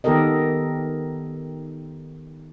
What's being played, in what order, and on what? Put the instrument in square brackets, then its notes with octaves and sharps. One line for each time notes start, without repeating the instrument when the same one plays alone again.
[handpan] D#3 B3 G4 A4 A#4 D#5